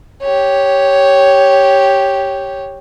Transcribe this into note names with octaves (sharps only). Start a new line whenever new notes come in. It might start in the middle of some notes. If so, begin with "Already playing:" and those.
G4 C#5